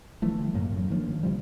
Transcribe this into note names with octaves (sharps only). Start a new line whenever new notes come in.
D3 E3 F3 A3
G3
F#1 F#2 A2 A#3
F#2
D#3 F3 A#3 D4
C3 F3 G3